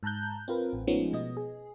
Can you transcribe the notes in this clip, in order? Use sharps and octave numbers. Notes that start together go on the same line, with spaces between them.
G#2 A5 A#5 F#6 G6
C4 F4 A#4 B4
A1
F3 G#3 A3 B3 C#4 D#4
B2 B3 D#5
G#4